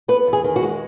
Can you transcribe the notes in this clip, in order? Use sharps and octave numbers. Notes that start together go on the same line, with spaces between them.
B3 B4
E2
G#4
D#3
F#4
G#3